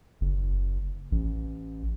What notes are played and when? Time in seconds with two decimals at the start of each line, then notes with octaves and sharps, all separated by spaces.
0.21 F#1
1.12 A1